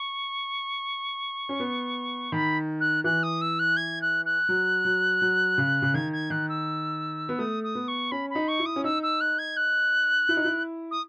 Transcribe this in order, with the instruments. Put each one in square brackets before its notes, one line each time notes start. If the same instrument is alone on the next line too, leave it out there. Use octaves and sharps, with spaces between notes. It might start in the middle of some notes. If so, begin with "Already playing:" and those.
Already playing: [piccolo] C#6
[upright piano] C#4
B3
[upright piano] D#3 [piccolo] B5
[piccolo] F#6
[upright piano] E3 [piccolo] F#6
[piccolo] D#6
E6
F#6
G#6
F#6
F#6
[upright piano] F#3
F#3
F#3
C#3
C#3
[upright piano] D#3 [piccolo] G#6
[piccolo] G#6
[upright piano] D#3 [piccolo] F#6
[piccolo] E6
[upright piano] B3
[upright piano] A3 [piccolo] D#6
[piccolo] D#6
[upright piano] B3
[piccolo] C#6
[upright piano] C#4 [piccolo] B5
[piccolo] B5
[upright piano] D#4
[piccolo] C#6
[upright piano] E4
[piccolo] D#6
[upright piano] C#4
[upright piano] D#4 [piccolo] E6
[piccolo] E6
F#6
G#6
F#6
[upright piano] E4
D#4
E4
[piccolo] D#6